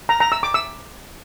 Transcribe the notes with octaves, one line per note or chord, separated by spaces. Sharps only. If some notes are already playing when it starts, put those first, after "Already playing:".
A#5
A#5
E6
D6
E6